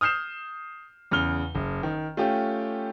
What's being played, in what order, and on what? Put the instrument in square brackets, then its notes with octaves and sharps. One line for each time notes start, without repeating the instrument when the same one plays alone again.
[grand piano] D#6 F6 G6 C7 E7
E2 C#3 F6 G7
F#1
D#3
A3 C#4 F4 G4